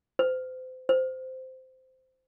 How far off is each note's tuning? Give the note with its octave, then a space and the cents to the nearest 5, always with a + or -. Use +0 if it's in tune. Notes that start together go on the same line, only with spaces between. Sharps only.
C5 -35
C5 -15